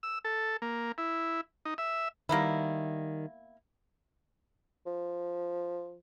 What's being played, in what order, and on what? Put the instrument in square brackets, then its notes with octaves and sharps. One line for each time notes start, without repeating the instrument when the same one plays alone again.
[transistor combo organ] E6
A4
A#3
E4
D#4
E5
[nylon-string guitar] D#3 G3 [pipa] A#3 B3 E4
[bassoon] F3